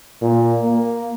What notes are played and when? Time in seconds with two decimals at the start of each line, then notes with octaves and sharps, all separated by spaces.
0.22 A#2
0.63 A#3